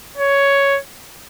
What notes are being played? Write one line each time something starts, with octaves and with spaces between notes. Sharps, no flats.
C#5